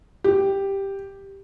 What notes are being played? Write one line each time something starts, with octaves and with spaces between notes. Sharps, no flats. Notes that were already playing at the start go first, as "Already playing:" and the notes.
G4